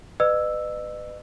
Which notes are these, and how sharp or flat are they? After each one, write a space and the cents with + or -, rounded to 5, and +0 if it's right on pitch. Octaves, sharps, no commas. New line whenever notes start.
B4 +20 D#5 -40 E6 +0